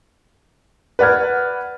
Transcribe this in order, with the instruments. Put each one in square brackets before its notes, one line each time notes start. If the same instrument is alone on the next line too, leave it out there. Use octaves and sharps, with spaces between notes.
[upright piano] B4 D5 F#5 F6 G#6